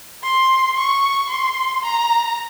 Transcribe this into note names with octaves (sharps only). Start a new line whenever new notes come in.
C6
C#6
C6
A#5